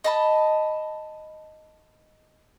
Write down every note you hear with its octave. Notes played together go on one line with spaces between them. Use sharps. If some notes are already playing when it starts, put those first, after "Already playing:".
D#5 A5 B5